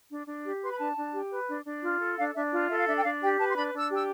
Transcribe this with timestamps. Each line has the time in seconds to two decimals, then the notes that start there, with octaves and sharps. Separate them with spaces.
0.10 D4
0.27 D4
0.45 G4
0.62 B4 C6
0.72 B5
0.78 D4 A5
0.96 D4
1.14 G4
1.30 B4
1.48 D4
1.65 D4
1.83 F4
2.00 A4
2.17 D4 F5
2.35 D4 E5
2.52 F4
2.69 A4 E5
2.78 F5
2.86 D4 E5
2.96 G5
3.03 D4 F5
3.21 G4 G5
3.38 B4 A5
3.50 C6
3.55 D4 B5
3.73 D4
3.78 E6
3.90 G4
3.95 E6